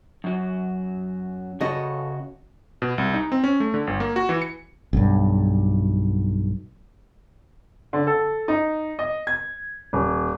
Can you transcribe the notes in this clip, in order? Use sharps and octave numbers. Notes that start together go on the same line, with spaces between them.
F#2 F#3
C#3 F#4 A4 C#5 D#5
B2
C2
D#4
C4
C#4
A3
D3
G1
A#3
F#4
E3
C#7
B1 G2
D3
A4
D#4
D#5
G#6
D#1